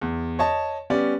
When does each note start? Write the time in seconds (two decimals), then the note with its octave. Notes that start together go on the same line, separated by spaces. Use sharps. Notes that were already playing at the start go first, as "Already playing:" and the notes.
0.01 E2
0.39 C#5 D#5 A5
0.90 G3 B3 C#4 D5